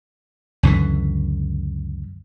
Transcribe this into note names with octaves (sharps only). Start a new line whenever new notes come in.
C#2 F#2 D3 E3